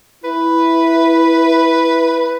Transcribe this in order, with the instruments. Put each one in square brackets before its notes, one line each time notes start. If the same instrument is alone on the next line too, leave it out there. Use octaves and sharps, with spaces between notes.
[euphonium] E4 [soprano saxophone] B4